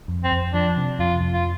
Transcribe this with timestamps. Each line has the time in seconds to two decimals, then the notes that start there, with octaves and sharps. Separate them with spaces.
0.08 F2
0.24 C4
0.32 F2
0.53 F3 D4
0.77 C3
0.99 F2 F4
1.21 F2
1.33 F4